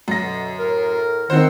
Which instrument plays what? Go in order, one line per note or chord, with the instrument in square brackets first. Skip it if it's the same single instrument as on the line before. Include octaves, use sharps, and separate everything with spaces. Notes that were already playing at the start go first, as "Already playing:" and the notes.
[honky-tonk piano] F#2 A#6
[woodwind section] B2 D3
A2 A#4
[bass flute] D#3 [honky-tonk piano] C4 C5 [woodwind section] D#4 E4 F#5